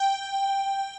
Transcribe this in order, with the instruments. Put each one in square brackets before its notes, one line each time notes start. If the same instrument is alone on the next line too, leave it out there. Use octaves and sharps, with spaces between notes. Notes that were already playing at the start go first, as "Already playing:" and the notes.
Already playing: [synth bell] G5